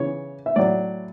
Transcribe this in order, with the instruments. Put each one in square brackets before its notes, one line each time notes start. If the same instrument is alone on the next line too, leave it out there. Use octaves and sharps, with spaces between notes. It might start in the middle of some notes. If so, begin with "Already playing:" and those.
Already playing: [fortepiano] C#3 E3 C#5
E5
A2 F#3 D5